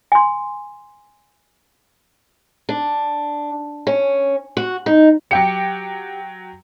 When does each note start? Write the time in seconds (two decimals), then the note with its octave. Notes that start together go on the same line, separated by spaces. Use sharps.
0.12 G#5 C6
2.69 D4
3.87 C#4
4.57 F#4
4.86 D#4
5.31 F#3 G4 G5 C#7